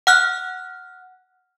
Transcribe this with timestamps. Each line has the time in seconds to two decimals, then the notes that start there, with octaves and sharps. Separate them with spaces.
0.07 F#5 F6 F#6